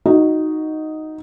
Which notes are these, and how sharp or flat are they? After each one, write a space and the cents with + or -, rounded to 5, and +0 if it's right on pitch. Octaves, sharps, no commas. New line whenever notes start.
D#4 +0 F#4 +0